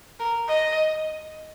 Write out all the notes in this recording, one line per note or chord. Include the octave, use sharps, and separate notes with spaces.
A#4
D#5